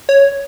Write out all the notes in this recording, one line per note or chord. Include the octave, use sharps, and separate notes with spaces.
C#5